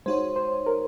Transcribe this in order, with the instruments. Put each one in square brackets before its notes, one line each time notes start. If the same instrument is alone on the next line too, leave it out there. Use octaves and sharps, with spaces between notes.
[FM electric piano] G#3 D#4 F#4 C#5 [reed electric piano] C5
[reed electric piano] C5
A#4